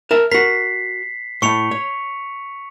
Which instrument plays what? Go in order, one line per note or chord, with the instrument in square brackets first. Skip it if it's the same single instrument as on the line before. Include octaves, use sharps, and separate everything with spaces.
[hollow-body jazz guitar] A#4 E5 A5
[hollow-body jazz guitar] F#4 A#4 [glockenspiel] B6 C7
[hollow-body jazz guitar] A2 A3 [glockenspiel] C#6 C#7 F7
[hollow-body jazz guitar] C#5